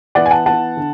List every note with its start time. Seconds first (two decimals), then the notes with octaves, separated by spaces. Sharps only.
0.15 E3 B3 D5 F#5
0.26 G#5
0.31 F#5 A5
0.46 E3 B3 F#5 A5
0.77 D3